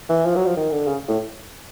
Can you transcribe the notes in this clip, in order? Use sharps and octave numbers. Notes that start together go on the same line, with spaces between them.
E3
F3
F#3
F3
D#3
D3
C#3
A2